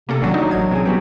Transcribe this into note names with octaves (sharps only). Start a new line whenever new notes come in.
C3 A#3 C#4 A4
A1 D#3 F#3 A#3 D4 F#4
F#3 D#4
A1 G#6
B2 C4 F#4 G#4
G3 B3 F#4